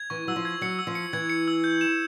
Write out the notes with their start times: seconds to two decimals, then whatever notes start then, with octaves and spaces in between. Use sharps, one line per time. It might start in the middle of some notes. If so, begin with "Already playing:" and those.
Already playing: G#6
0.10 E3 C#6
0.27 F#3 E6
0.36 F3
0.45 G#6
0.61 F#3 C#7
0.79 E6
0.87 F3
0.95 C#7
1.13 E3 G#6
1.30 C#7
1.48 E6
1.64 G6
1.81 E7